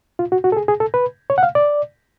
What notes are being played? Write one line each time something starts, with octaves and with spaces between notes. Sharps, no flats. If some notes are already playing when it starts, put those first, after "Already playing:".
F4
F#4
F#4
A4
G#4
G#4
A4
B4
C#5
F#5
F5
D5